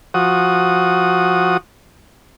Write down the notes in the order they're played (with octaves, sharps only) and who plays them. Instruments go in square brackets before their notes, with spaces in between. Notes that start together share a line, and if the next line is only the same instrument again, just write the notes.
[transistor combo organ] F3 F#4 D#6